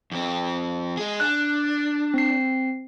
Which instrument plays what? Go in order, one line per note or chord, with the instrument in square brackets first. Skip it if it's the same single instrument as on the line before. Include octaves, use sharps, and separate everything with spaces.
[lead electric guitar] F2 C4
G#3 G#4
[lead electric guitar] D4 [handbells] F#6
[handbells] C4 C7